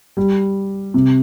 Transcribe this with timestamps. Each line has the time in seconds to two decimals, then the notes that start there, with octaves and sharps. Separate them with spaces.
0.17 G3
0.94 C3